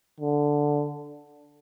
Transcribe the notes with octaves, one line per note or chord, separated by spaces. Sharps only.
D3